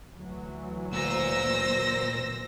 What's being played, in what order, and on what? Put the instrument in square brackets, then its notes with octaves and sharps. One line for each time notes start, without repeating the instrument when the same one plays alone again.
[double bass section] D2 E3 F#3
[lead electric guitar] A#2 [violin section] C5 A#6 [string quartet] E6